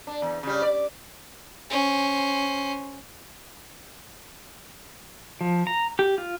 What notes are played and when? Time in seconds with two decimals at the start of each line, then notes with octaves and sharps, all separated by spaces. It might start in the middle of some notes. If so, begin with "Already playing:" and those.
0.07 D4
0.22 E2
0.43 C#3 G3
0.62 D5
1.70 C#4 C5
5.41 F3
5.67 A#5
5.99 G4
6.18 F4